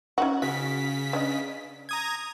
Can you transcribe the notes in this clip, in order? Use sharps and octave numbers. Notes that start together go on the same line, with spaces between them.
C#4 D#4 F#4
C#3 F#4 B6
C#4 D4 D#5
A#5 D#6 G#6